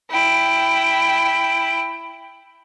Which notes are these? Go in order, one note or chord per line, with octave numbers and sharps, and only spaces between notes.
E4 G5